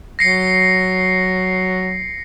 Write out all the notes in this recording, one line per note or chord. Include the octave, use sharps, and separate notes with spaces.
F#3 A#6 C7 C#7